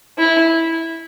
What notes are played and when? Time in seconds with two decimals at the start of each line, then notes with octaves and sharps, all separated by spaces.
0.18 E4